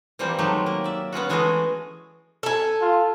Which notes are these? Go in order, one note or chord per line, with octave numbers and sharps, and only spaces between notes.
E3 F3 G3 A#3 C4 C5
D#3 F#3 G#3 A3 G4
A#3
D5 E5
B3 C#4 F4 F#4
E3 G#3 A3 B3 F#4 G#4
A4 G#5
F4